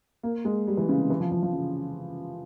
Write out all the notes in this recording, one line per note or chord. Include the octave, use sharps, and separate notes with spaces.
A#3
G#3
G3
E3
C#3
C3
E3
F3
F3
F3
C#3